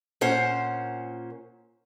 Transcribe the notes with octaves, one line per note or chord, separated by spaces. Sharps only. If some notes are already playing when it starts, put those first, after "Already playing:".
A#2 C#4 C5 F#5